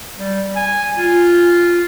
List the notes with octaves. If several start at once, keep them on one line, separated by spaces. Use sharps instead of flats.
G3
G#5
F4